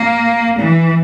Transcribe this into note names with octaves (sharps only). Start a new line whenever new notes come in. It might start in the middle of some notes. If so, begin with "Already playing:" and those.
Already playing: A#3
E3